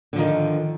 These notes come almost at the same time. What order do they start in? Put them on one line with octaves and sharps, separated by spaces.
D3 F3 D#3